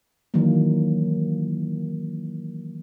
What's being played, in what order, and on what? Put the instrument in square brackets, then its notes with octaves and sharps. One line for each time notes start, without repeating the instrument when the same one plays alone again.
[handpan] D#3 E3 F#3 A#3